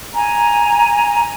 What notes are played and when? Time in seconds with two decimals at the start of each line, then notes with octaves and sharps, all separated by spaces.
0.13 G#5 A#5